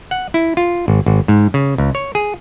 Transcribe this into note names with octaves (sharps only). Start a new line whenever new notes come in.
F#5
E4
F4
G#1
G#1
G#2
C#3
C#2
C#5
G#4